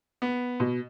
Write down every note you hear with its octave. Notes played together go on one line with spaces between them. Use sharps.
B3
B2